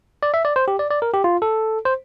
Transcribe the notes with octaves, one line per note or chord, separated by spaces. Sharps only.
D5
E5
D5
C5
G4
D5
D5
A#4
G4
F4
A4
C5